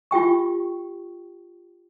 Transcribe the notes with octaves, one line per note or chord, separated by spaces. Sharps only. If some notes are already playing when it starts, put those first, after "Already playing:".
F4 G4 G5 C#6